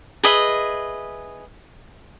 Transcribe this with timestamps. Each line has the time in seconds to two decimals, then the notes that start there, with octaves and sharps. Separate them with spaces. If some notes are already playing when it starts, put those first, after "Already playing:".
0.24 G#4 B4 D#5 E5